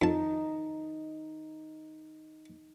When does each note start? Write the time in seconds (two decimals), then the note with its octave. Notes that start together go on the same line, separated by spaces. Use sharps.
0.02 F2 D#4 A5